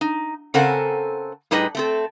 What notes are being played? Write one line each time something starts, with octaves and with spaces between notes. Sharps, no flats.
D#4
C#3 C4 A4 A#4 F#5 G#5
A2 G3 D#4 G#4 B4 D#5
A3 C4 A4